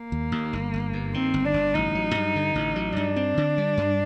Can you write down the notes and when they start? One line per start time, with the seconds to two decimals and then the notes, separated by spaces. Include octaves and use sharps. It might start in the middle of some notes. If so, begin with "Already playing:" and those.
Already playing: A#3
0.12 D#2
0.32 D#2
0.53 G1
0.73 G1
0.93 G2
1.14 D#3 C4
1.34 G1
1.44 D4
1.54 G1
1.74 A1 D#4
1.95 F#3
2.15 G2
2.36 D3
2.55 A1
2.76 F#3
2.96 G2 D4
3.16 C4
3.37 D3
3.58 G3
3.77 G2